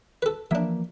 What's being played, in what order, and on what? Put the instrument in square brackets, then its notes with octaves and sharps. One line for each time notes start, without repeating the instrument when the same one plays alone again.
[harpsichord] A4 B4
[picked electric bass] E3 F3 A#3 [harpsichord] D4 E5